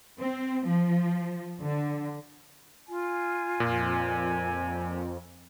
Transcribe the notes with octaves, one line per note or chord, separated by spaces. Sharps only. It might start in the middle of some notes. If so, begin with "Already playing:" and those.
C4
F3
D3
F4 G#5
F2 A#2